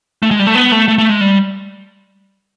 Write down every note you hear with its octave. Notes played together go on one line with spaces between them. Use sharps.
A3
G#3
G3
A3
B3
A3
A3
A3
G#3
G3